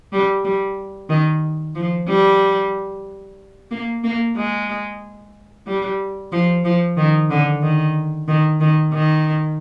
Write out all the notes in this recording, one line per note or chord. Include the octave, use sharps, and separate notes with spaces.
G3
G3
D#3
F3
G3
A#3
A#3
G#3
G3
F3
F3
D#3
D3
D#3
D#3
D#3
D#3